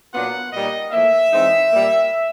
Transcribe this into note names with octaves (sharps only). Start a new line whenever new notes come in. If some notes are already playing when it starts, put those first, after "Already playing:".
A#2 F#3 B3 D4 F4 F#5
A#2 G3 A#3 D#4 D#5
A2 F3 A#3 E5
E3 G#3 C4 D#4
A#2 G3 A#3